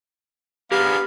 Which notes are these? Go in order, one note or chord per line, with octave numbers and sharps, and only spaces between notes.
B3 D4 G4 G#4 A#4 F5